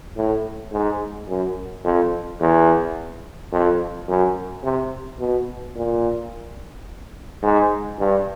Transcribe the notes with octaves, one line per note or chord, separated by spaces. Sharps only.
A2
G#2
F#2
F2
E2
F2
F#2
C3
B2
A#2
G#2
G2